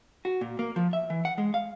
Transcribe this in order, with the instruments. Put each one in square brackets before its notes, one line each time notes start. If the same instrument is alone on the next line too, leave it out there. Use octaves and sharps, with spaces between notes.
[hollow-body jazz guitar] F#4
A#2
A#3
F3
E5
E3
F#5
G#3
F5